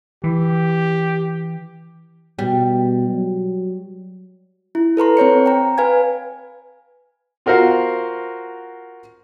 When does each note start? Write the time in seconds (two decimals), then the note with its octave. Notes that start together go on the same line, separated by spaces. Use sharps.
0.24 E3 G4
2.39 B2 G3
3.09 F#3
4.75 E4
4.97 A4 B4 A#5 C6
5.17 C4 C5 C#5 C#7
5.46 G5 A#5
5.78 B4 F5 G#5 G#6
7.46 F4 F#4 A#4 C5 F5 F#5